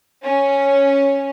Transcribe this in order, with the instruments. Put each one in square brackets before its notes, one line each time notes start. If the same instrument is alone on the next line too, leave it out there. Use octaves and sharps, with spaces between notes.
[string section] C#4